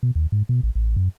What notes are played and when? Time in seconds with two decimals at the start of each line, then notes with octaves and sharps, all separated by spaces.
0.03 B2
0.15 D#2
0.32 G#2
0.49 B2
0.63 A1
0.75 A1
0.97 F#2